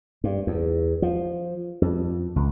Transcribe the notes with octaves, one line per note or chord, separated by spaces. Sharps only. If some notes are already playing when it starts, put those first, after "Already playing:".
G2
E2
F3
F2
C#2